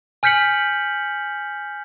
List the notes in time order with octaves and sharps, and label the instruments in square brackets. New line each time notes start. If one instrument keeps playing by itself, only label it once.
[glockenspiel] G#5 F6 G6 B6 C#7 F#7